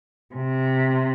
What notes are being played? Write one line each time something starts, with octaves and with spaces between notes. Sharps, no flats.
C3